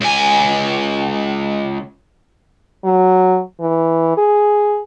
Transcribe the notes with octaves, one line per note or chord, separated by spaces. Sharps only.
C#2 G#5
F#3
E3
G#4